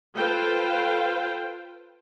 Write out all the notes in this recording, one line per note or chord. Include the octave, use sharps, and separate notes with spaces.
F4 A4 B4 C5 F5 G5